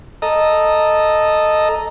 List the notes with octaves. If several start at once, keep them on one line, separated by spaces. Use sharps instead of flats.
A4 D#5 A#5